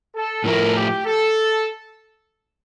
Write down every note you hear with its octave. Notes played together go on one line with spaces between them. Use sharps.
A4
A2 F3 A3 E4 A#4
G4
A4